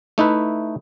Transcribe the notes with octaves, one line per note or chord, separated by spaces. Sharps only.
A3 D#4 E4 B4